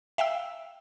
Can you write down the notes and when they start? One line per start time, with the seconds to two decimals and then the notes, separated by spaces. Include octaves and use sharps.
0.18 E5 F5 G5 E6